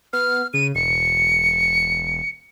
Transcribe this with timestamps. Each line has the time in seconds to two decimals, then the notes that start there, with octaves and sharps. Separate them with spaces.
0.13 B3 F6
0.54 C#3 D#7
0.75 E1 C#7